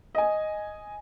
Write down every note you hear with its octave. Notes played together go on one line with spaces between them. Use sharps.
D#5 G#5